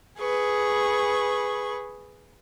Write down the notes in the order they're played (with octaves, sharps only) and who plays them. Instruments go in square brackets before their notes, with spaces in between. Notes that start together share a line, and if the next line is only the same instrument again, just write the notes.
[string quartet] G#4 B4 C#6